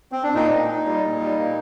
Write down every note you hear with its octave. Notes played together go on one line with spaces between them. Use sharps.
C4
D4
A#2 D#4
A#2
A#2
G3
A#2
G3
A#3